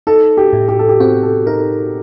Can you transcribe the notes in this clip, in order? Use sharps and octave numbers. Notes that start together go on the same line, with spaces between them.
D#4 A4
G4
A2
G4
A4
G4
C4 F#4
A4
D#4 A#4